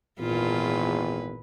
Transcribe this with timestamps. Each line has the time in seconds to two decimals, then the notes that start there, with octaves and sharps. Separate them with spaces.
0.20 G#1 E2 A#2 F4 B4